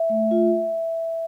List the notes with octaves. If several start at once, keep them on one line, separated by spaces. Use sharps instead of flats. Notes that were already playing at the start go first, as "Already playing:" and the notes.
Already playing: E5
A3
F4